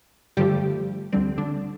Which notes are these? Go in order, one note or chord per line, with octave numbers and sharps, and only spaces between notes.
G2 D3 F3 G3 A3 G4
D2 D3 G3 C4
D3 D4